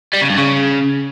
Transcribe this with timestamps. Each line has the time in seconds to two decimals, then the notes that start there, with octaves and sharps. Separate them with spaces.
0.13 G3
0.21 C#3
0.30 G2
0.38 C#3